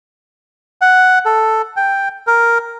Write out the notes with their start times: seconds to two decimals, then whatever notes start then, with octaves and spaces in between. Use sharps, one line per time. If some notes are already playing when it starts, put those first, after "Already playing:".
0.81 F#5
1.25 A4
1.77 G5
2.27 A#4